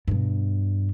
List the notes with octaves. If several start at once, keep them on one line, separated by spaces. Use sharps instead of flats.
G2 B2